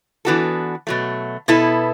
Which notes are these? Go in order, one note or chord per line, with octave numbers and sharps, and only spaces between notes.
E3 B3 D4 F#4 A4
B2 F#3 A3
B2 B3 E4 A4